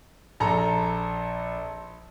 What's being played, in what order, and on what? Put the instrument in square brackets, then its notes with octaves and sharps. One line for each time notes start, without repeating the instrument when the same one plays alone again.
[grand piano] A#1 A4 A#5